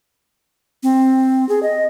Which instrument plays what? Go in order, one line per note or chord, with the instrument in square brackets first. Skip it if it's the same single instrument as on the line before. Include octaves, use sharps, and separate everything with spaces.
[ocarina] C4
G#4
D#5